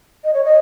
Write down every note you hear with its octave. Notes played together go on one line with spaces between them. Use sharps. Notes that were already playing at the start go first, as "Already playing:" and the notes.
D#5
C#5
D#5